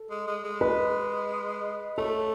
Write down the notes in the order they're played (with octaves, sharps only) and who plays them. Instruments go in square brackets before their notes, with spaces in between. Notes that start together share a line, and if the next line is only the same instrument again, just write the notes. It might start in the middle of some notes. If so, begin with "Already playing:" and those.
Already playing: [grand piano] A4
[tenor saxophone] G#3
G#3
G#3
[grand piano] B4 D#5
[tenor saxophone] A3 [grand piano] A4 C#5